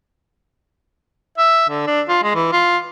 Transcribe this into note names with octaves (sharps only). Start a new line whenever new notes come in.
E5
D3
D4
F4
G#3
E3
F4